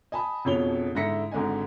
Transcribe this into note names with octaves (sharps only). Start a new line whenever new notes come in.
D#5 G#5 A5 B5 D#6
E1 F2 B2 C#5 F7 G7
G#2 D3 E4 A#6 B6 C#7
G#1 G#2 D3 D#5 G#5